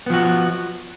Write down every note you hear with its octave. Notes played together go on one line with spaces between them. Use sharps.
F3 B3 F#4